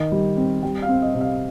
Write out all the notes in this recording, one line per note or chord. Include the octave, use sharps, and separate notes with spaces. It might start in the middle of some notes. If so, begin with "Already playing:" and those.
Already playing: D#3
G3
C4
G3 G5
F5
C4
D#5
C3
F5